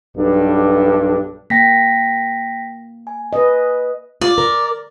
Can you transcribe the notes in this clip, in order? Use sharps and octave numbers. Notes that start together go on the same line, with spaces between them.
B1 G2 D4 A4
A#3 G5 A#6 B6
G#5
B4 D#5
F4 D5
A#4